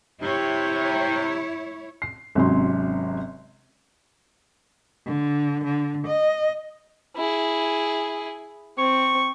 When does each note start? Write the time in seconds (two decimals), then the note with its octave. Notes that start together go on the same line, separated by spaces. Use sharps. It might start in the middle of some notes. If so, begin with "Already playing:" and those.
0.22 C3 E4 C#5
2.02 C7
2.35 G#1 C3 F#3 C#4 C6
5.06 D3
5.64 D3
6.07 D#5
7.17 E4 G#4
8.78 C4 C#6